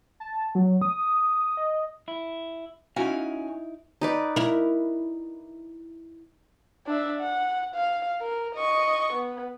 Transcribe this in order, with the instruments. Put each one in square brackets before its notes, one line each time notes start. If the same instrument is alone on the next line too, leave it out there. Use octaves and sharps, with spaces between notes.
[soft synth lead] A5
F#3
D#6
D#5
[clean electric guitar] E4
[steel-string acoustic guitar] C#4 F#4 G#5 [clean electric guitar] D#4 E4 F5
[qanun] D#4 B4 D5
[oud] E4 A#4
[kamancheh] D4 E5
F#5
F5
A#4
D#5 C#6
B3